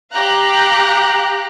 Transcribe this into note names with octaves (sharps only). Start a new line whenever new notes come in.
G4 F5 A#5 F#6